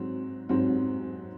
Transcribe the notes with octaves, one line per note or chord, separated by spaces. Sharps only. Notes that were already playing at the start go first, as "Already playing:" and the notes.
Already playing: G#2 F#3 C4
G#2 F#3 C4